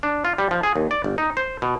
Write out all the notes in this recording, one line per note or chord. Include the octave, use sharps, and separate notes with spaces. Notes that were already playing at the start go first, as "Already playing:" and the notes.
D4
F4
G3
F3
G#4
D#2
D5
G1
D#4
C5
B2